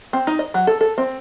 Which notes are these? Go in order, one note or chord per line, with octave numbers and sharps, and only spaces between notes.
C4
D#4
D#5
F#3
A4
A4
C4